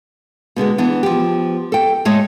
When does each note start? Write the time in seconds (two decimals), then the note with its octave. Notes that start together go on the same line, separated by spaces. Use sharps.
0.56 B2 D3 G#3 B3
0.78 E3 B3 D4
1.03 F3 G4
1.72 A4 G5
2.05 A2 G#3 A3 A4 C#5 D#5